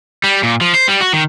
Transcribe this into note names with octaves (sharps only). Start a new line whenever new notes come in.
G3
A#2
F3
C5
G3
F#4
D#3